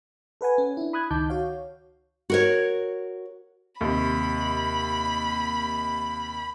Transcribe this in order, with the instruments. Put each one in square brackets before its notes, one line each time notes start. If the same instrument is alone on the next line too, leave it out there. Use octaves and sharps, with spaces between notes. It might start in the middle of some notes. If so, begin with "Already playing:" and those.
[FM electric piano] A4 B4 F#5 G#5
C#4
D4 E4
B5 D#6 F#6 G#6
C#2 D#3 D#4 A5 D6 G6
F#4 C#5 F5
[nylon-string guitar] F#4 A#4 C#5
[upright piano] D#2 C3 [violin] B5